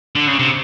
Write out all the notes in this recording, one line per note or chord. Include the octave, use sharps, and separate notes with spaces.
D3
C#3
C3